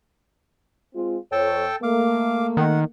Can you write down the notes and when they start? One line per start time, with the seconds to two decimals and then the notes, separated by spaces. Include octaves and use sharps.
0.95 G#3 C4 F4
1.32 F2 A4 C#5 G5 A5
1.83 A3 A#3 F5 D6
2.57 D#3 F#5